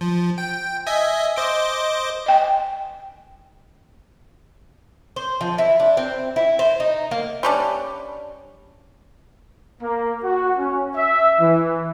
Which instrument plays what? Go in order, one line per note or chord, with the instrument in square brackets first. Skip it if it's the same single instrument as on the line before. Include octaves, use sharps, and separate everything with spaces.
[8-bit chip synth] F3
G5
D#5 E5 G#5
C5 D#5 D6
[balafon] D#5 G5 G#5
[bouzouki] C5
F3
E4
D4
C4
E4
C5
D#4
A#3
[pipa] G3 C#4 D4
[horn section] A#3
F#4
C#4
E5
E3